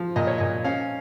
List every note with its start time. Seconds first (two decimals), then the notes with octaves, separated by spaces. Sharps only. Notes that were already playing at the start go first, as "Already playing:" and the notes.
Already playing: F3
0.16 A#2 D#5
0.27 C#5
0.38 A#2 D#5
0.65 C#4 F5